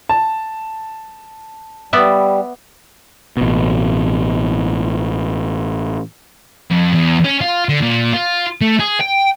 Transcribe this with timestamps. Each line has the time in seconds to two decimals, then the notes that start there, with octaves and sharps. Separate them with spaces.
0.09 A5
1.93 G3 B3 D5 E5
3.37 A1 B2
6.71 F2
6.94 E2
7.24 C#4
7.41 F4
7.69 D3
7.82 A#2
8.13 F4
8.61 A3
8.80 G#4
9.01 G5